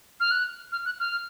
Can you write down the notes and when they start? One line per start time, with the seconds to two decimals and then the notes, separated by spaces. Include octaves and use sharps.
0.20 F6
0.31 F#6
0.72 F6
0.85 F#6
1.00 F6